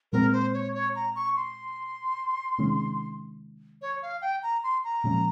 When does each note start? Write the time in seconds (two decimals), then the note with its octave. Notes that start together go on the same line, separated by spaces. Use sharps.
0.12 A#2 G#3 C4 A#4
0.33 C5
0.54 C#5
0.75 C#5
0.95 A#5
1.16 C#6
1.36 C6
2.58 C3 D#3 G#3 C#4
3.82 C#5
4.02 F5
4.22 G5
4.43 A#5
4.64 C6
4.84 A#5
5.04 A#2 F3 G#3 C#4